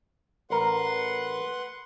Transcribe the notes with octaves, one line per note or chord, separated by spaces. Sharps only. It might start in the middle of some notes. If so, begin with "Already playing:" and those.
A1 A#4 B4 F#5 C6